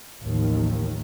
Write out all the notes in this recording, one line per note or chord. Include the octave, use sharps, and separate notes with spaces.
A1 D#2 D#3 F3